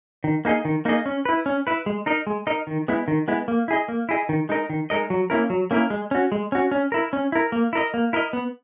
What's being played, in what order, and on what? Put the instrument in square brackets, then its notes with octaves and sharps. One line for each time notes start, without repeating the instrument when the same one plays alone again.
[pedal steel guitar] D#3
A#3 D#4 G#4 D#5
D#3
A#3 D#4 G#4 D#5
C#4
E4 B4
C#4
E4 B4
G#3
D#4 A#4 D#5
G#3
D#4 A#4 D#5
D#3
G#3 B3 E4
D#3
G#3 B3 E4
A#3
E4 G#4 D#5
A#3
E4 G#4 D#5
D#3
G#3 D#4 A#4 D#5
D#3
G#3 D#4 A#4 D#5
F#3
A#3 C#4 E4 A#4
F#3
A#3 C#4 E4 A#4
G#3
C#4 F#4
G#3
C#4 F#4
C#4
E4 A#4
C#4
E4 A#4
A#3
E4 A#4 D#5
A#3
E4 A#4 D#5
B3